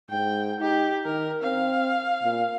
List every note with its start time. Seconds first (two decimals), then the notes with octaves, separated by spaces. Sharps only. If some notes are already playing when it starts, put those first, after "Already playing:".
0.10 G#2 G5
0.61 D#4 G4
1.06 D#3 A#4
1.43 C4 F5
2.23 A#2